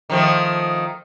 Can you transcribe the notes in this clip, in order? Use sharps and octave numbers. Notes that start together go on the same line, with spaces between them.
D#3 F3 A3